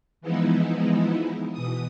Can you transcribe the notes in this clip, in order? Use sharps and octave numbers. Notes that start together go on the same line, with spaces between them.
E3 F3 G#3 B3 D#4 E4
B2 E3 D#6